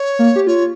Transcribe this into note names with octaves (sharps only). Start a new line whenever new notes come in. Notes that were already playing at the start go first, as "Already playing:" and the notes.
Already playing: C#5
A#3
G4
F4 C#5